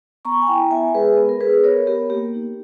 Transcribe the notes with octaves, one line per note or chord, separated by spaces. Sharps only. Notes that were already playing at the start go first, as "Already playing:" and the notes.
B3 A#5 C#6
G#5
E4 G5 A#5
B3 E5 G#5
G#3 G#4 B4
B3
A#4
B3 G#4 B4
B3 A#4 C#5
B3 G4 A#4
A#3 G4
D#4